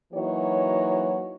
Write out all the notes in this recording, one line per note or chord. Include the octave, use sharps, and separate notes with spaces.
E3 F#3 A#3 D#4 F#4 C#5